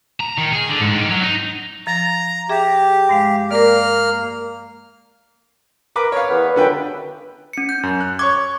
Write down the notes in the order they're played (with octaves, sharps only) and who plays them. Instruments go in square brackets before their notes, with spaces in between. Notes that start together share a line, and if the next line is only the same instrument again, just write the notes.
[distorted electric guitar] A#5
D#3
G#4
D3
G#2
D#3
F#3
D#4
[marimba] F3 A6 [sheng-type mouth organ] A#5
[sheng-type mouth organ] G4 [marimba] G#4 E5
[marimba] G2 G#3 F5
[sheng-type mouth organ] A#3 F6 [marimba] A#4 D5
[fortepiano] A#4 B4 D6
C#5 F5
[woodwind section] E2 B3 B4
[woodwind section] C#2 F#2 [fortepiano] D3 B4 G5
[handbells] C#4 C#7
G6
[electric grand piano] F#2
F#6
[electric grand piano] C#5 C#6 G#6 [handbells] D6